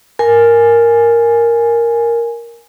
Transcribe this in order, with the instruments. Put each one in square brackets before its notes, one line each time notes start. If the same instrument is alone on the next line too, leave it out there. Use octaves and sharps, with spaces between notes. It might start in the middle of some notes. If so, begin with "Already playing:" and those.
[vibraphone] A#4 G#5